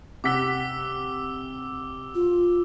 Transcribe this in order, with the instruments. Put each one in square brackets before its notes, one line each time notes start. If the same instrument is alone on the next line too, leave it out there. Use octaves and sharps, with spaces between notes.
[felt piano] C3 F#5 B6 [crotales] D6 E6 G7
[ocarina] F4